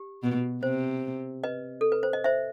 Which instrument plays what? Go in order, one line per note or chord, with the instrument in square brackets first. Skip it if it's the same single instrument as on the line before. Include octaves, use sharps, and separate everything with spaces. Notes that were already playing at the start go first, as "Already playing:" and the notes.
Already playing: [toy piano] G4
[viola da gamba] B2
[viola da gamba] C3 [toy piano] C5
[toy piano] B4 D#5
A4
B4
C5
D#5
C5 E5